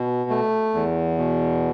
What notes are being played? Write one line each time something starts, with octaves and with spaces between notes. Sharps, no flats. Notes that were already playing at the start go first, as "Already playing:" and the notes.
Already playing: B2
A3
E2
B2